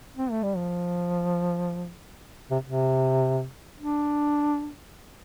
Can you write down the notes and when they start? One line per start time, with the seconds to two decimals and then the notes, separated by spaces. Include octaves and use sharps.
0.17 C4
0.31 A3
0.43 G3
0.57 F3
2.51 C3
2.65 C3
3.79 D4